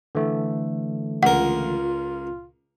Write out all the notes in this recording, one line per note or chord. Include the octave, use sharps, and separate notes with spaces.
D3 E3 A3
C#2 F4 A#4 F#5